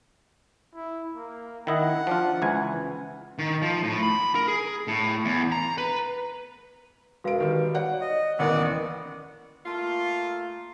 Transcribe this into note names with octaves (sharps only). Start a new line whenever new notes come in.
E4
A#3
D#3 E4 D#5 F#5
F3 D4 F4
C#2 E3 G#5
D#3
F3
A2
B5
A#4
G#4
A2
E2
A#5
B4
E1 F#4 B4 F5 D7
D#3 G3
F#4 C#5 D5 F#5
D#5
A1 D#2 E3 B3 A#4 D5 F#5
A3 A#3 F4